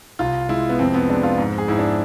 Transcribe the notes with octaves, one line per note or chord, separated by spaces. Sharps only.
C2 F4
G#3 E4
B3
F2 C4
B3
G#3 D4
F4
G#2
G#4
G#2 E4
D4